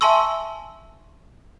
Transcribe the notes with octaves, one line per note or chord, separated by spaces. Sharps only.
E5 G#5 A5 C6 C#6 E6